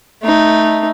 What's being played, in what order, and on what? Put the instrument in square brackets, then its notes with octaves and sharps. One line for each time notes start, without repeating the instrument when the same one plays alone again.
[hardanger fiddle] A3 D#4